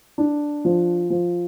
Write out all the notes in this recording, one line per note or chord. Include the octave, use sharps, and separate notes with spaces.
D4
F3
F3